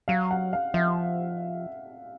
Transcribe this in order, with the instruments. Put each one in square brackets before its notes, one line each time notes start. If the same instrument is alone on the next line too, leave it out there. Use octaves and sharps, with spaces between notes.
[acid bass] F#3 [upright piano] F5
[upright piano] F#5
F5
[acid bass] F3 [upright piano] E5